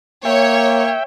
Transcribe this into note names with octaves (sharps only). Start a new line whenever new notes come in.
A#3 C#5 E5 G5